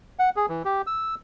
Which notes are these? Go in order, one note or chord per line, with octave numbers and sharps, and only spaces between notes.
F#5
G#4
E3
G4
E6